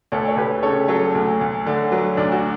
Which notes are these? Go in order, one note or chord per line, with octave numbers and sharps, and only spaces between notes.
D2 A4 C#5
C#5
D2 G4 B4
C#3 A4 C#5
F#3 A4 C#5
D2
D2
D3
F#3
D2 D4
F#4